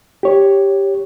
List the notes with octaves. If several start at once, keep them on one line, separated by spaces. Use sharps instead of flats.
G4 C#5